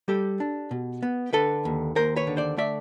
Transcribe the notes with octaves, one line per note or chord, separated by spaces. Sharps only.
G3 G4 A4
D4
B2
B3
D3 A4 B4
D#2
D#2 A#4 C5
B4 C#5
D3
C5 D5
A3 D5 E5